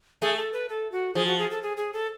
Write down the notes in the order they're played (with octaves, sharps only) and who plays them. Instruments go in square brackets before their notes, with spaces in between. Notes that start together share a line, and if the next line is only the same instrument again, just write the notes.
[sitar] A3 [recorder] G#4
[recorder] A4
B4
A4
F#4
[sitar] F3 [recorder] G#4
[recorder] F#4
G#4
A4
G#4
G#4
A4